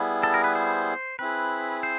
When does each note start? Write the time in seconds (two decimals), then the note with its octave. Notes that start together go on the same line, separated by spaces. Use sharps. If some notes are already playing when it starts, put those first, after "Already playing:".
Already playing: G3 B3 E4 G#4
0.23 A4
0.34 A#4
0.44 B4
0.55 C5
1.19 C4 E4 G#4 B4
1.83 C5